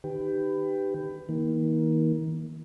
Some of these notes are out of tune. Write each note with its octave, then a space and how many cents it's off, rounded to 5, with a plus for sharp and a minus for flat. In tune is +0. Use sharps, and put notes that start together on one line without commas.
D#3 -25 G4 +0 B4 +20
D#3 +40 A#3 +20